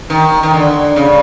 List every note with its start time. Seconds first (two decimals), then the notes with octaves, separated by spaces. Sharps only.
0.10 D#3
0.43 D#3
0.54 D3
0.96 C#3